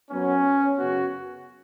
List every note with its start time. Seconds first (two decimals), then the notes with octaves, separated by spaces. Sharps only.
0.10 F#2 F#3 B3 C#4
0.76 F#2 C#3 B3 F#4